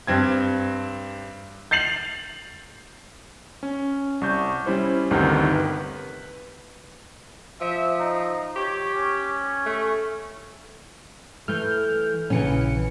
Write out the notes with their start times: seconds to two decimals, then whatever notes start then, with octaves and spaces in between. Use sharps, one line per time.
0.07 G2 C4 G#6
1.71 G6 A6 C7 F7 F#7
3.63 C#4
4.21 C2 C#6 G6
4.66 G3 C#4 E4 C5
5.11 G1 D2 C3 D#3
5.52 B4
7.61 F3 E5
8.00 D#4
8.56 G4 C#5
8.95 C#4
9.66 A3
11.48 E3 A3 F6 G6
12.30 A#1 C#3 E3 C#4 C#7